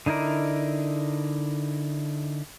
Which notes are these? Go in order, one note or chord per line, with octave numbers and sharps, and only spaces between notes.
D3 D#4 E4 A#4 D5